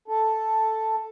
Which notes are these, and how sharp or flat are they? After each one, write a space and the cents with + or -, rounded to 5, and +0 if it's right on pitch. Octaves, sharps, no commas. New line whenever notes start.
A4 +0